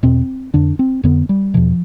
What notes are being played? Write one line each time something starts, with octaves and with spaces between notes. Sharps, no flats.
E2 B2 C4
F2 D3 D4
C4
F2 D3 B3
G3
E2 B2 F3